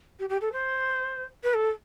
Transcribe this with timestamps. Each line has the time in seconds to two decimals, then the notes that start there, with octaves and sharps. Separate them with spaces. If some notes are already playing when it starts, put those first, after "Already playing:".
0.19 G4
0.29 G4
0.41 A4
0.53 C5
1.43 B4
1.54 A4